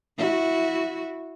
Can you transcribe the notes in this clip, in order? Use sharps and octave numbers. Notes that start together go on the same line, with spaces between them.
E4 F#4